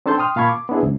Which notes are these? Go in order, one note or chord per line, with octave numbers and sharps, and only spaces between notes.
C4 D4 A4 A5 C6 G6
G5 C6 D#6 F6
A#2 F5 A5 B5 C#6 G#6
D6
B3 C4 D4 E4 G#4
C#2